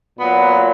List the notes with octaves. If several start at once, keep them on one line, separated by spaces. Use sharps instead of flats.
A#2 F#3 B3